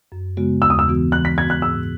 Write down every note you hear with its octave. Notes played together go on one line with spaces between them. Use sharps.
F#2
C#3 G#3 B3 F#4
D#2 E6
D#6
E6
C#3 E3 B3 F#4
E3 F#6
B6
B3 F#4 G#6
F#6
G#2 E6